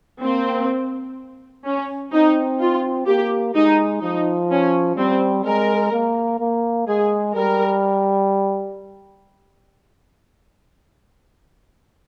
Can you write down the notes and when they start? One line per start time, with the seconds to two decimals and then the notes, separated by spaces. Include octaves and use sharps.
0.22 A#3 C4
1.65 C#4
2.12 C4 D#4
2.60 F4
3.07 A#3 G4
3.55 G#3 D#4
4.02 F3 D#4
4.50 C#4
4.97 G3 C4
5.45 G#3 A#4
5.93 A#3
6.40 A#3
6.88 G#3 G#4
7.35 G3 A#4